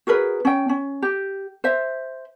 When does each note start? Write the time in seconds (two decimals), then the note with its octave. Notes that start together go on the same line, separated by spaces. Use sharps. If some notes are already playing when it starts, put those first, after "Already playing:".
0.07 F#4 G#4 A#4 B4
0.45 C#4 G5
0.69 C#4
1.02 G4
1.64 C5 E5